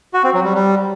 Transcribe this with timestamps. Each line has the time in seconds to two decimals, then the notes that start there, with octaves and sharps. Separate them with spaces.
0.14 F#4
0.24 C4
0.34 F#3
0.44 G3
0.54 G3